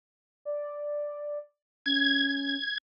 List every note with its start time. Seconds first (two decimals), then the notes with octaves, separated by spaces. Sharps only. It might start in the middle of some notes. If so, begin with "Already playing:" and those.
0.45 D5
1.86 C#4 G#6